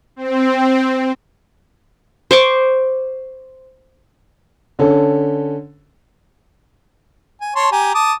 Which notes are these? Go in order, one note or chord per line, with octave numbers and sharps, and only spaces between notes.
C4
C5 C#6 D6
D3 C#4 A4
G#5
C#5 A5 C6
G4 G#5 A#5
A5 D6 D#6